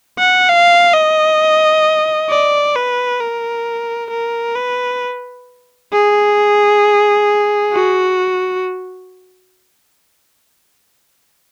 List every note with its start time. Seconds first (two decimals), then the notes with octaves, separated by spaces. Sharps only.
0.19 F#5
0.49 F5
0.94 D#5
2.30 D5
2.76 B4
3.20 A#4
4.11 A#4
4.56 B4
5.92 G#4
7.73 F#4